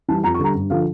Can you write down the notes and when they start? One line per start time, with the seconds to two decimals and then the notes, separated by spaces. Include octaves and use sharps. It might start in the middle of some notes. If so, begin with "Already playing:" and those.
0.08 E3 G3 A5
0.24 F2 A#5
0.34 C#6
0.39 D3 G3 A#5
0.54 G2
0.70 D3 F3 F5